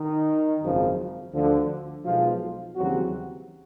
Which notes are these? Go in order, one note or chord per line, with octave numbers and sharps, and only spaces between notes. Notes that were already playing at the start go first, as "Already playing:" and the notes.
Already playing: D#3 D#4
G#1 F#2 C#3 F3
D2 D3 F3
B1 B2 F3 G#3 F4
D#2 C#3 E3 F#3 G3 C4 F#4